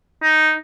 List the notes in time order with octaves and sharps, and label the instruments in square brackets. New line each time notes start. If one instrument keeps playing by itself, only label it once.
[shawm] D#4